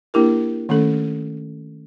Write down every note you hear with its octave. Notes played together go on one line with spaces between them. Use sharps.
A#3 D4 E4 G4 A#4
D#3 A3 C#4 A4